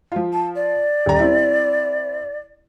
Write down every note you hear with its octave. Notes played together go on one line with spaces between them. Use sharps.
F3 F4
A5
D5
D#1 A#5
C4 E4